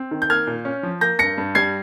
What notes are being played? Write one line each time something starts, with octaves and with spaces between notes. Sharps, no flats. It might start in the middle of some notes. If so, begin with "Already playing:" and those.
Already playing: C4
D#3
G6
A#3 F6 G#6
A#2
C#4
F3
A#3 G6 A#6
G2 A#6 C#7
G2
G3 G#6 C7